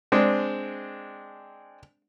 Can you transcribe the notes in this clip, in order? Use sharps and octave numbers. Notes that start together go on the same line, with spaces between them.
G#3 C4 D4